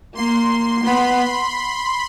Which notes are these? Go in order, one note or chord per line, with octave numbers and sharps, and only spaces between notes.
A#3 C6
B3 B5